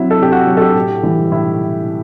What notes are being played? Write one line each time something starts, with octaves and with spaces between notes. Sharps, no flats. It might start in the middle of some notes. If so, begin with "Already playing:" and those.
Already playing: C3 F#3 E4
A4
C3 G4
F#4
F#3
A4
G4
A2
E3 G3
A2 E4